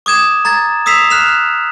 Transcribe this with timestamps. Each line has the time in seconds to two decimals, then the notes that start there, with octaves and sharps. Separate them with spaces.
0.06 D6 D#6 G#6 E7
0.45 A#5 G#6 A6
0.86 D#6 E6 B6 C7 E7 F7
1.10 F6 F#6 C7 E7 F7